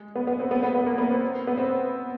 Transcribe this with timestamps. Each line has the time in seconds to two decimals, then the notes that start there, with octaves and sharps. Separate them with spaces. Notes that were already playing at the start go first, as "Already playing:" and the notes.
Already playing: G#3
0.15 B3
0.27 B3
0.40 C4
0.51 B3
0.63 B3
0.75 B3
0.86 A#3
0.98 B3
1.10 C4
1.47 B3
1.57 C4